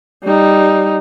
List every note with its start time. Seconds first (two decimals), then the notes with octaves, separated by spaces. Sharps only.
0.24 G3 D#4